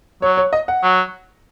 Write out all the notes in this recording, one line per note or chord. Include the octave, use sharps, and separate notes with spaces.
F#3 C#5
C#5
D#5
F#5
F#3